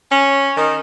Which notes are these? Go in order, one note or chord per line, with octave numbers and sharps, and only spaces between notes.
C#4
D#3